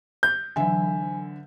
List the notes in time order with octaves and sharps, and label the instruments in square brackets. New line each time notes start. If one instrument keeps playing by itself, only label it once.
[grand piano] G6
[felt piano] D3 E5 [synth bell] E3 F#3 [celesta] G#5